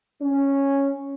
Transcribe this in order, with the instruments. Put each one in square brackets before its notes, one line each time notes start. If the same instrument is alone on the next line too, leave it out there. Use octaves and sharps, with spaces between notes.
[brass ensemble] C#4